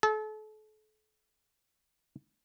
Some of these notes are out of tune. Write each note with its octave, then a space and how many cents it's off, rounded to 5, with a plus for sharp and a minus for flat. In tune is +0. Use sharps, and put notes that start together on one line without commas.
A4 -35